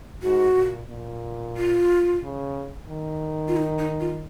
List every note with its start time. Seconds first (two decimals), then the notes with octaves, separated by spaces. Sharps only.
0.23 G#2 F#4
0.56 A#2
0.89 A#2
1.57 F4
2.23 C#3
2.89 D#3
3.48 F4
3.57 D#4
3.79 D#4
4.00 F4